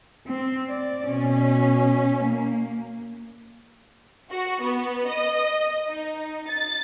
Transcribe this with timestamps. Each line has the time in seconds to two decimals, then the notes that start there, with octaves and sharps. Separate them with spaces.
0.27 C4
0.69 D5
1.07 B2 C#4
2.24 A#3
4.31 F#4
4.62 B3
5.08 D#5
5.88 D#4
6.49 A6